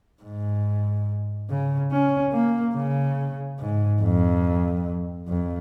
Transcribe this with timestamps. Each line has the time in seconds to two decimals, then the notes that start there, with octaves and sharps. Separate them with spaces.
0.23 G#2
1.49 C#3
1.91 C#4
2.33 A#3
2.75 C#3
3.60 G#2
4.02 F2
5.28 F2